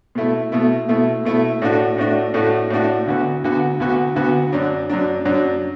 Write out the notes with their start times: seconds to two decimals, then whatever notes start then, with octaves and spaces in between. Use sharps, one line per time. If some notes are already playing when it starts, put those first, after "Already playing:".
0.15 B2 A3 E4
0.52 B2 A3 E4
0.89 B2 A3 E4
1.25 B2 A3 E4
1.62 A2 A3 D4 F#4
1.98 A2 A3 D4 F#4
2.34 A2 A3 D4 F#4
2.70 A2 A3 D4 F#4
3.07 D2 D3 B3 F#4
3.44 D2 D3 B3 F#4
3.80 D2 D3 B3 F#4
4.16 D2 D3 B3 F#4
4.53 F#2 F#3 D4
4.90 F#2 F#3 D4
5.25 F#2 F#3 D4